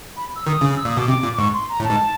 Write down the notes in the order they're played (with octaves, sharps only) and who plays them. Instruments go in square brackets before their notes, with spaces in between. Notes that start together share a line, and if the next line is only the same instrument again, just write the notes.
[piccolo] B5
E6
[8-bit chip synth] D#3 [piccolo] D#6
[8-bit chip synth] C#3
[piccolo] D#6
E6
[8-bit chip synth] A#2 [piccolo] D#6
[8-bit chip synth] B2 [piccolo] D6
[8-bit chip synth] C3 [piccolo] D6
[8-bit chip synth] A#2
[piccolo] D6
[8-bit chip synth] G#2 [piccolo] C#6
[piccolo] C6
A#5
[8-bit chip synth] A2
[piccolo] A5
[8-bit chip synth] G#2